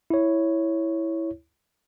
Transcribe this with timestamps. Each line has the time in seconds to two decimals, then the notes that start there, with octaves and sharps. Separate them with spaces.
0.10 E4 C#5